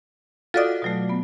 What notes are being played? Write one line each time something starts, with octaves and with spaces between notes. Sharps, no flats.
F4 F#4 A4 D5 D#5 D#6
B2 F#3 A3
B3